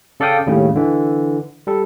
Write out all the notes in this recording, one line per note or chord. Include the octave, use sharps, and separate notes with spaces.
C#3 A4 D5 F5 G5 D#6
D#2 A2 C#3 G3
D3 E3
G3 A4